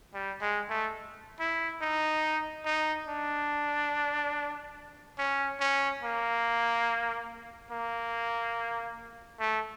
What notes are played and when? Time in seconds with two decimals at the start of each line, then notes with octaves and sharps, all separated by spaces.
0.14 G3
0.41 G#3
0.70 A3
1.39 E4
1.82 D#4
2.65 D#4
3.09 D4
5.19 C#4
5.60 C#4
6.03 A#3
7.71 A#3
9.40 A3